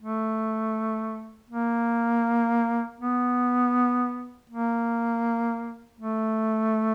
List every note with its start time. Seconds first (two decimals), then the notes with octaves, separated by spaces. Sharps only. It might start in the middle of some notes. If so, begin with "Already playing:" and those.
0.01 A3
1.50 A#3
3.01 B3
4.50 A#3
6.00 A3